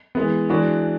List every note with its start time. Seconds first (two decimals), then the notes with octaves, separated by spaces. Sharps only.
0.15 E3 G#3 B3
0.49 E3 G#3 D4 F#4